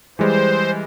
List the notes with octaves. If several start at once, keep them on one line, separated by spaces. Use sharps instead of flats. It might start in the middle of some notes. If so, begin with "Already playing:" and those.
E3 G3 G#3 C5